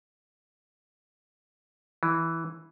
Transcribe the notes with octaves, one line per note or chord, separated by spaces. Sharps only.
E3